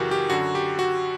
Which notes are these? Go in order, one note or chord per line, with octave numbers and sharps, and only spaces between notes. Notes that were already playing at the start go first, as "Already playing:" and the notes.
Already playing: F#2 C#3 E3 F#4 G4 A#4
G4
F#2 D3 F#4
G4
F#4